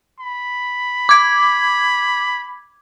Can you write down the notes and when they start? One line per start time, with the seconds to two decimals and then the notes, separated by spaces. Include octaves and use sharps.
0.20 B5
1.09 D6 G#6